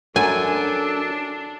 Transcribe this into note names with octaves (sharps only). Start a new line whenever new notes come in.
F#2 D4 A4 G#5